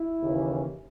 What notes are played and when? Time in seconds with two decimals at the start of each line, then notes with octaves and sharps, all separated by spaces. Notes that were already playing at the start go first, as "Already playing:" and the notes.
Already playing: E4
0.21 D#2 C#3 E3